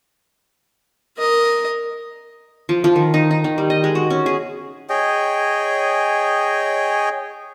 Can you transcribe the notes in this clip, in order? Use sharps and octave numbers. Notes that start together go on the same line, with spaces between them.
A#4 D#5
F3
F3
D#3
D#4
D#4
D#3
G3
D#5
G#3
F#4
C#4
G#4
G#4 C#5 D#5 G5